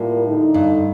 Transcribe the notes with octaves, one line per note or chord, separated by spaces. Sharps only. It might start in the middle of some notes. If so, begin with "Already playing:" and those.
Already playing: A2 G3 A#3 F4 A#4
D3 A3 D#4
G2